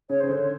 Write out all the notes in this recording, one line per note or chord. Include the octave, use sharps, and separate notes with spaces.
C#3 C#5
C#3 C5
D3 C#5